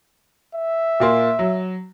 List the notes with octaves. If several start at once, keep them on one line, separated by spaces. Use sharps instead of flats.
E5
A#2 A#3 C6
F#3